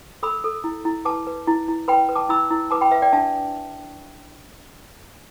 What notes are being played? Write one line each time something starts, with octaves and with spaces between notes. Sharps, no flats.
A4 B5 E6
A4
E4
E4
B4 A5 D6
B4
E4
E4
B4 G5 B5
B4
A5 D6
E4 B5 E6
E4
B4 A5 D6
G5 B5
B4 E5
D5 G5
D4 E5 A5